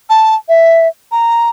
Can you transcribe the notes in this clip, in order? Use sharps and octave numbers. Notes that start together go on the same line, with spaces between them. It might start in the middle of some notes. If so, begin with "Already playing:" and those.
A5
E5
A#5